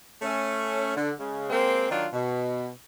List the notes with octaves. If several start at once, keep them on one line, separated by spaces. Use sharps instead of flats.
A3 C#4
D3
C#3 G#3
G#3 A#3 C4
D#3 F#3 D4 F4
B2